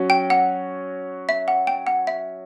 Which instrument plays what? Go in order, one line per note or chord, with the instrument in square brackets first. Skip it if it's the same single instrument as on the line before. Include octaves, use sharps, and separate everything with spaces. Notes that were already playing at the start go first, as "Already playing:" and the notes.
Already playing: [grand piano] F#3 C#4 F#4
[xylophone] G5
F#5
E5
F#5
G5
F#5
E5